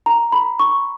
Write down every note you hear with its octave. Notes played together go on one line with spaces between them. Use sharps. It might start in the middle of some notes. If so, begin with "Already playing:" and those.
A#5
B5
C#6